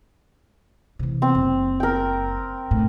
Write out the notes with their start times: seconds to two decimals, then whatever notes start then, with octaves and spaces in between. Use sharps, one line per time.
0.99 C3 E3
1.22 C4
1.35 F#1
1.80 A#4 G5
2.71 B1 A2